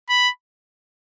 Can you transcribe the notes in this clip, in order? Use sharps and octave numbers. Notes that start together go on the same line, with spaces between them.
B5